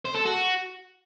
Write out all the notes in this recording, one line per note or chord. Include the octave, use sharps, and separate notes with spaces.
C5
A4
F#4